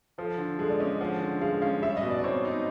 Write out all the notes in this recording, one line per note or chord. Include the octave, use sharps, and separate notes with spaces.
F3 A4
D3
G#3 A4
D5
C#4 D#5
F3 F#5
D3
G#3 F5
C#4 F5
G3 E5
D#5
B2
D5
C4 C#5
D#4